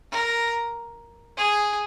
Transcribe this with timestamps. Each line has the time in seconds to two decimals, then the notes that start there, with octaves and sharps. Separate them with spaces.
0.12 A#4
1.37 G#4